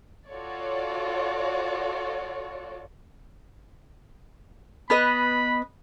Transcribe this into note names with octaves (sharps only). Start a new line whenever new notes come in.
F4 F#4 A4 C#5 D5
B3 B4 D#5 B5